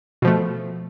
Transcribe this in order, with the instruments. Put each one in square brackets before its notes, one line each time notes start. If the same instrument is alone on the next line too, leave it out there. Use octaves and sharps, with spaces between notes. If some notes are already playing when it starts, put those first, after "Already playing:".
[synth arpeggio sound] B2
F3
A3